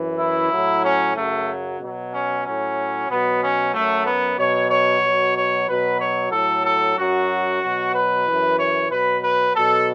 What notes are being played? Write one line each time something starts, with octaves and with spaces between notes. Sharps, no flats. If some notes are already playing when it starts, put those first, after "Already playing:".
Already playing: F#2 E3
E4
A2 F#3
C#4
F#2 C#3 F#3 A3
B2 F#3
C#4
A2 F#3 C#4
B2 F#3 B3
C#4
F#2 F#3 A3
B3
B2 F#3 C#5
C#5
B2 F#3
C#5
B2 F#3 B4
C#5
A2 F#3 A4
A4
F#2 F#3 F#4
B2 F#3
B4
E3
F#2
C#5
B2 F#3 B4
B4
B2 F#3 A4